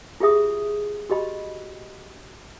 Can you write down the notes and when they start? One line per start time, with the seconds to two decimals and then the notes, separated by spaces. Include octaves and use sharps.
0.20 F4 G4 G#4 E5 D#6
1.10 F#4 G4 D#5 B5